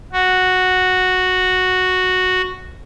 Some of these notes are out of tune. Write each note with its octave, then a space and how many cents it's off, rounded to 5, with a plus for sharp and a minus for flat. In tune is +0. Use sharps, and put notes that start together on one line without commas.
F#4 -5